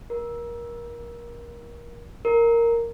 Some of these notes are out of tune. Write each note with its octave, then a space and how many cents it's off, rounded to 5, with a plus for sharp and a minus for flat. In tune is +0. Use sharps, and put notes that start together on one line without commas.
A#4 +25
A#4 -5